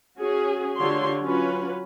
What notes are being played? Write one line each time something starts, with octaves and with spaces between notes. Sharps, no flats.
C#4 F#4 G#4
D3 F4 G4 C#5 C6
F#3 C#4 F4 B4